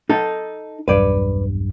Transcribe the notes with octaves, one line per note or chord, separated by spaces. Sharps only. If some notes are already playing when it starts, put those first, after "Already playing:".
D#4 A4
B1 E2 G2 B4 D5